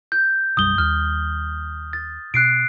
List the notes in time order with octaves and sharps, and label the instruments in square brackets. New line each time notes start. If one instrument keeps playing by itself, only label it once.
[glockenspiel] G6
[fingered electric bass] B1 F#2 G3 [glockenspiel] D#6 G7
[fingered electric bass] D#2 G3 [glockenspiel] F6
[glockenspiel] A6
[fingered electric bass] B2 [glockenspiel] F#6 C7 D7